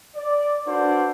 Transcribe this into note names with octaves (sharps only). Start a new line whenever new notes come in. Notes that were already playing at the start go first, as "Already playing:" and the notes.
D5
D4 F#4 A4 B4 C5 D5